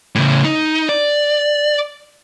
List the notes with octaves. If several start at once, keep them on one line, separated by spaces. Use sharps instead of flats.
A2 C#3
D#4
D5